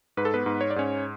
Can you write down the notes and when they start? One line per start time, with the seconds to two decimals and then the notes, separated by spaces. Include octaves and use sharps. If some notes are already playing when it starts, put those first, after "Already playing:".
0.17 G#2 B4
0.25 A4
0.34 B3 B4
0.46 G#2
0.61 C#5
0.70 D5
0.76 G#2 C#4 C#5